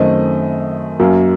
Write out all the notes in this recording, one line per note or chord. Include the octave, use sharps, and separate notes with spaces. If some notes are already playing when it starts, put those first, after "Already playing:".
Already playing: F#2 D#3 A3 C4 D#5
F#2 F#3 A#3